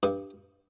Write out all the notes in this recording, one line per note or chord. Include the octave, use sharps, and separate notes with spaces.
G2